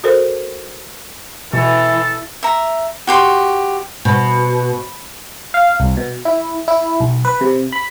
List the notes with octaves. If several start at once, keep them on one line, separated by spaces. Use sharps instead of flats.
F#4 A4 A#4 C5
B2 E3 A4
E5 A#5
F#4 G4 C6
B2
F5
C2
B2
E4
E4
B1
B4
C3
B5